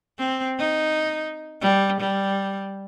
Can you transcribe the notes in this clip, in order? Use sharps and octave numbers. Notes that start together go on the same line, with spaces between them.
C4
D#4
G3
G3